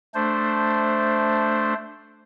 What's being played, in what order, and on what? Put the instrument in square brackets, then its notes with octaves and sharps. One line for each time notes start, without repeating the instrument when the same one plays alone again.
[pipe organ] A3 D4 C5